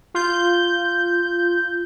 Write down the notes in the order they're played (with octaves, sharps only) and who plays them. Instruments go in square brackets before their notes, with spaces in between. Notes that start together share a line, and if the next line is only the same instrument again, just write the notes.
[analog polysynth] F4 G6